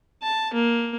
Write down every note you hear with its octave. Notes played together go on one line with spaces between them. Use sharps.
A5
A#3